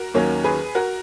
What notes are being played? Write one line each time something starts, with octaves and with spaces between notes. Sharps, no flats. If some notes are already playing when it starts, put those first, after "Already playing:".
Already playing: F#4 A#4
D#2 D#3 F#3 A#3 C#4
G#4 B4
F#4 A#4